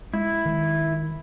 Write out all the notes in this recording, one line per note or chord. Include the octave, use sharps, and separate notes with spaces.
G#3 E4
D#3